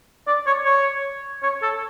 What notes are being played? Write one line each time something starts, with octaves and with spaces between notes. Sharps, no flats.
D5
C#5
C#5
C#5
A4